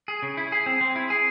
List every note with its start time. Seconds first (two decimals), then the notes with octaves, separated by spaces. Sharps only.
0.08 G#4
0.22 C#3
0.37 E4
0.52 G#4
0.66 C4
0.81 C4
0.96 E4
1.10 G#4